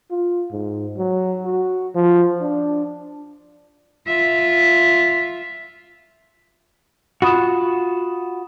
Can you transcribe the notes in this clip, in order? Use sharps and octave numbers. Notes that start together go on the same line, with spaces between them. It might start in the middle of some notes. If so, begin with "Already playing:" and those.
F4
G#2
F#3
F#4
F3
D4
F4 E5
F4 F#4 B5 D#6 E7